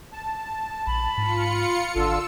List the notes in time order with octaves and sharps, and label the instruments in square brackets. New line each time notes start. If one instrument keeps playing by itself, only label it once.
[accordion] A5
[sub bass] A#1 [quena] B5
[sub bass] G#2 [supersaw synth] F4 C#7
[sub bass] G#1 [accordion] D3 F4 A4 [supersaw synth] E6